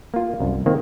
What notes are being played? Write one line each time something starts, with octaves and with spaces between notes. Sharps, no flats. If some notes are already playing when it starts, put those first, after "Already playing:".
A#3 F4
C2 F#2
D#3 A#3 C4